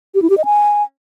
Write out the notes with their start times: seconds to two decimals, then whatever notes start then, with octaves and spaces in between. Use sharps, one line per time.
0.15 G4
0.22 E4
0.30 G4
0.37 D#5
0.45 G#5